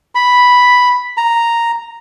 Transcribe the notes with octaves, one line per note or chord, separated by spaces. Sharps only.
B5
A#5